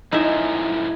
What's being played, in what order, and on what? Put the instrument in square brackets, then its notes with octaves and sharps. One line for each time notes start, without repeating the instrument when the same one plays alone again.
[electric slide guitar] F#2 A2 F3 [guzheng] D#4 E5 [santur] E4 G#5